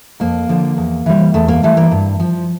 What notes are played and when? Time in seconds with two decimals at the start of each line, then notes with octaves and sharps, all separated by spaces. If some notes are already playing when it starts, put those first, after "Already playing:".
0.20 F2 A#3
0.49 D3 F3
0.77 E2
1.06 E3 G3
1.34 E2 A3
1.48 A#3
1.63 E3 G3 A3
1.77 A#3
1.91 G2
2.20 F3